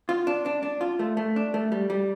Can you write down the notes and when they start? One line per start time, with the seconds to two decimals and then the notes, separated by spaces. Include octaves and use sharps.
0.09 F4
0.27 D4
0.46 D4
0.63 D4
0.81 F4
0.99 A3
1.17 A3
1.36 D4
1.54 A3
1.72 G3
1.90 G3